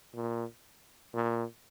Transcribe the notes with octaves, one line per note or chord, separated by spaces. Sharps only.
A#2
A#2